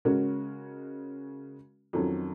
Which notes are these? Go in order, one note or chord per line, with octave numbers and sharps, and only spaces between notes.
C#3 G#3 C#4 F#4 A#4
F2 D#3 F#3 C#4